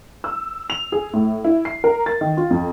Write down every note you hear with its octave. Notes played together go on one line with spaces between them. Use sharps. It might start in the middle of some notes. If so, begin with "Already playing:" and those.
E6
F7
G#4
A2
E4
C7
A#4
A6
D#3
F4
F2